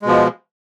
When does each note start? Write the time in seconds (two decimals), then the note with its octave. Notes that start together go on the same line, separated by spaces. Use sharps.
0.02 G#3
0.05 B2
0.08 F3